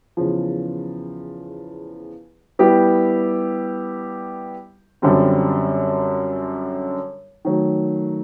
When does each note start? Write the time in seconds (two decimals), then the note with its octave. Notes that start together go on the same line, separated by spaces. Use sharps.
0.17 E2 C#3 F3
2.59 G3 B3 E4 G4
5.02 F#2 D3 G3 C4
7.45 D#3 F#3 A3